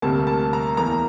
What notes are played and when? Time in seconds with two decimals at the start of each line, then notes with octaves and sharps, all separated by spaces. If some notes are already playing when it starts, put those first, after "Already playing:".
0.02 D2 C3 G3 A#3 A5
0.27 A5
0.53 A#5
0.77 E2 E3 A#3 A#5